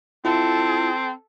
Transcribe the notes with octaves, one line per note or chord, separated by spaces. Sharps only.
C4 E4 F4 A4